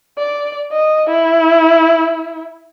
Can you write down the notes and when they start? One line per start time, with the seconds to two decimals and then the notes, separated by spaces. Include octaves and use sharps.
0.18 D5
0.72 D#5
1.10 E4